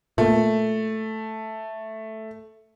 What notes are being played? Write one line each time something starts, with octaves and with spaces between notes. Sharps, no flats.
A#2 A3